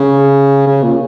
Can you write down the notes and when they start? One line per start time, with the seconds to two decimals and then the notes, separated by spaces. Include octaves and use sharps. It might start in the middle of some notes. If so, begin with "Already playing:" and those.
Already playing: C#3
0.67 C#3
0.83 A#2